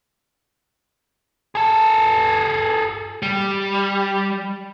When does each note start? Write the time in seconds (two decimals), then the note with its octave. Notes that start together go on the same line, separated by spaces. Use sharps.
1.55 G#4 A4
3.23 G3